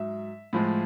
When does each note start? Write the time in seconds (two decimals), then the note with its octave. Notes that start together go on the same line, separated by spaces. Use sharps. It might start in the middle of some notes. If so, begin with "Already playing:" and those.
Already playing: G#2 F#3 E5
0.53 A2 F3 G#3